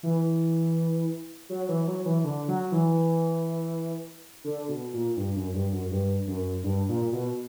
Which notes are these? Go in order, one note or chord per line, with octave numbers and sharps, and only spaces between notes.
E3
F#3
E3
F#3
E3
D3
F#3
E3
D3
B2
A#2
G2
F#2
G2
F#2
G2
F#2
G2
A#2
B2